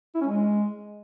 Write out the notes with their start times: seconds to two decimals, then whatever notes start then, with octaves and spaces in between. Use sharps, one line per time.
0.15 E4
0.21 C#4
0.27 G#3